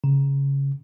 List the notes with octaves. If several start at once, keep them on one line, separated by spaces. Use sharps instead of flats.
C#3